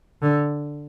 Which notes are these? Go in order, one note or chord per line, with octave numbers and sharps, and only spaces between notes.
D3